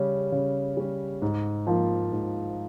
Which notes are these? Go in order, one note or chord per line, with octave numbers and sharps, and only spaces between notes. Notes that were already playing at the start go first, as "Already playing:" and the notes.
Already playing: C#3 G3 C#4
C#3
G3 C#4
G#2
F3 A#3 F4
G#2